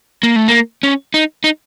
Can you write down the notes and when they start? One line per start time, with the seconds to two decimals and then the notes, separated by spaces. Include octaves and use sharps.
0.23 A#3
0.36 A3
0.48 A#3
0.83 C#4
1.14 D#4
1.44 D#4